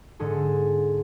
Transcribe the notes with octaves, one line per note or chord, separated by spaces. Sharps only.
G#2 D3 G#4 A4